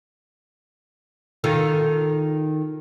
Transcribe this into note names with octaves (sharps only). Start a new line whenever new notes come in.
D#3 F4 A4